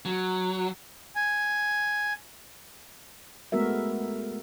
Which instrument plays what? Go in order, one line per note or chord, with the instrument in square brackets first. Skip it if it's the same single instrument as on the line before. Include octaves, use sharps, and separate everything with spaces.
[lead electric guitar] F#3
[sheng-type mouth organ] G#5
[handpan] G#3 A3 B3 F#4 A#4 E5